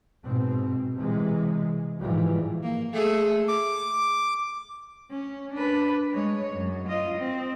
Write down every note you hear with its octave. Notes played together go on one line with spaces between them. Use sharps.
G#2 B2 C4
C3 E3 G#3
G#2 E3 F3 G3
A#3
A3 G#4 A4
D6
C#4
D4 B4
G#3 C#5
F#2
F4 D#5
C4